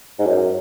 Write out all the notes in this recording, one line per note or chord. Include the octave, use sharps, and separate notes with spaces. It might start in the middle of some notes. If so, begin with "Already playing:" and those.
G#2
F#2